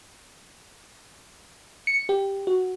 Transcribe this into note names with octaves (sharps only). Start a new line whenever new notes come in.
C#7
G4
F#4